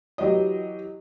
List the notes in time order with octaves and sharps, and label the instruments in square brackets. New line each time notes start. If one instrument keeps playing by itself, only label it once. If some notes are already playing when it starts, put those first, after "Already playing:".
[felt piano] E3 F#3 G4 D#5